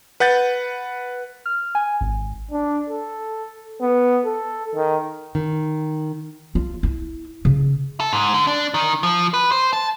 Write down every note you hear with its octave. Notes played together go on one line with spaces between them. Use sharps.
B4 F#5 G6 A6
F6
G#5
G#1
D4
A4
B3
A4
D#3
D#3
F4
E4
C#3
A4
G#2
D3
D4
D#3
F3
B4
C5
A5